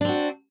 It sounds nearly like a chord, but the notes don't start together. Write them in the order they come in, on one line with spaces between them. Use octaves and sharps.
D4 C4 F#4